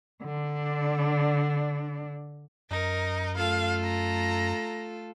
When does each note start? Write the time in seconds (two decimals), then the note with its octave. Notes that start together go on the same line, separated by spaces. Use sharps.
0.22 D3 D4
2.70 F#2 D#4 A#4
3.36 A3 F4 A4 F5
3.83 A#5